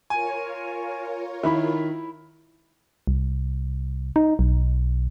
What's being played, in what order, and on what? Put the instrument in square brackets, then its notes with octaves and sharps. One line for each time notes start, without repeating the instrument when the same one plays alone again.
[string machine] F4 A#4 C#5 [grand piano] G#5
[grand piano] D#3 [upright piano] E4 B5
[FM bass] C2
D#4
B1